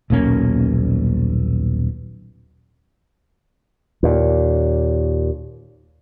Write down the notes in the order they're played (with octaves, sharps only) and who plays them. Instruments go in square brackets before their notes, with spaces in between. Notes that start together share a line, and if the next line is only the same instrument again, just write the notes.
[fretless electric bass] D#1 B1 A#3 C#4
[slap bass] D#2 A#2